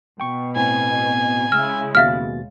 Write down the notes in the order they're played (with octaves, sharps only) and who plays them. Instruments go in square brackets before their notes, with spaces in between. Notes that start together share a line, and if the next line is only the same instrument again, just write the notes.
[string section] B2 [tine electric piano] G5 C#6
[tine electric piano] A2 C4 [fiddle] G#5
[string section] C#3 G#3 E4 [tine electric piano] E6 [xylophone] F6
[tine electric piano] D#2 B2 A6 [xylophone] E5 F5 F6